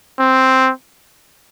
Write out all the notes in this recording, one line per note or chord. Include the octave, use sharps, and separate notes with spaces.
C4